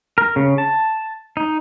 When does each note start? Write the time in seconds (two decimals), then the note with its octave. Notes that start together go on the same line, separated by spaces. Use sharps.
0.18 A#4
0.36 C#3
0.58 A5
1.37 D#4